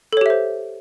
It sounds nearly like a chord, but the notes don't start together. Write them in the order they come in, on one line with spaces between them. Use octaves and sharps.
A4 C#5 G4 E5 C5